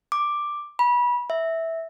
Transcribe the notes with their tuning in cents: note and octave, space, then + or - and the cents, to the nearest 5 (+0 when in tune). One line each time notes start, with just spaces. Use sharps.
D6 +5
B5 -25
E5 -10